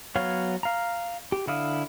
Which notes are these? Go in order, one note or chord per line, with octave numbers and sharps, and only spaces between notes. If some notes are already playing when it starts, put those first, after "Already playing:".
F#3 B3 C#5 F5
F5 A#5
G4
D3 E4 F5 D#6